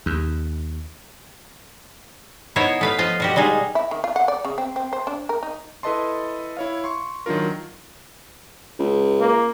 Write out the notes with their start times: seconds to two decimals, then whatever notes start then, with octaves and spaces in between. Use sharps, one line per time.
0.06 D#2
2.56 B3 D#4 E4 C5 C#5
2.81 A3 B4 F5
2.98 F3 F4 D#5
3.20 B2 F#4 G4
3.36 G3 G#3 D#4 G#4
3.75 E4
3.91 D#3
4.04 F4
4.16 F#5
4.28 D5
4.45 C#3
4.58 C4
4.76 C4
4.93 C5
5.07 D4
5.29 A#4
5.43 D#4
5.83 E4 A4 B4 D#5 A5 C6
6.57 E4 C#5 F5
6.84 C6 C#6
7.26 D#3 F#3 D4 F4 A#4
8.79 C#2
9.20 A#3